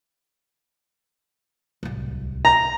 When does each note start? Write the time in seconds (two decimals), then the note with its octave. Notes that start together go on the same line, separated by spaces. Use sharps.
1.83 D1 C2
2.45 A#5